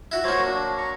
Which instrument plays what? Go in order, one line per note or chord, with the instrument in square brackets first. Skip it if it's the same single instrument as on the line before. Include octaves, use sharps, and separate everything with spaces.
[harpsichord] E4 F#4
[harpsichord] F#3 A#3 [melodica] F#4 C5 C#5
[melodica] D4
A#5 C#6